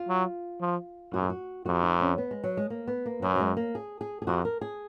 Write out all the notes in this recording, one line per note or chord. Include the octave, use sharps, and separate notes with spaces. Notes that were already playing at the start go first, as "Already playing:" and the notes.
Already playing: F4
F#3
F3
F#2 F#4
G#4
F#4
F2 F#4
D#4
C#4
B3
G#3
F#3
G#3
A#3
B3
A#3
F#2 F#3
F#3
G#3
A#3
G#4
G#4
G#4
F2 F#4
A#4
G#4